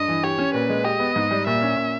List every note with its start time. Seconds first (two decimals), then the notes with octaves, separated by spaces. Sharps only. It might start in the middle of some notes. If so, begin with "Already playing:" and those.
Already playing: G2 D#5
0.08 E3
0.23 G4 C#5
0.38 C#4
0.53 A#2 B4
0.69 G#3
0.84 G4 D#5
0.99 B3
1.16 G#2
1.31 G3
1.46 A#2 E5
1.61 C#4
1.76 A#2